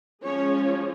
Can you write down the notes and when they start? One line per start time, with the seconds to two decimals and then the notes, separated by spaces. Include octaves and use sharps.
0.25 F3 G#3 C#4 C#5